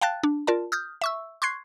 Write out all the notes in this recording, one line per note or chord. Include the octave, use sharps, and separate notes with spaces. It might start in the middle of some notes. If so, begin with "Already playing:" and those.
F5 G5 A5 F#6 A6
D4
F4 A#4 D5 A5
D#6 F6 G6
E5 C#6 E6
C6 C#6 F#6 G#6 C7